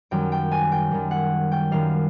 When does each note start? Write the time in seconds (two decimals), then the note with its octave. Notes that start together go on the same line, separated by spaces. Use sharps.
0.11 F#2 D#3 G3 G5
0.32 G5
0.51 G#5
0.72 G5
0.91 F#2 D#3 G3
1.11 F#5
1.52 G5
1.71 F#2 D#3 G3 F5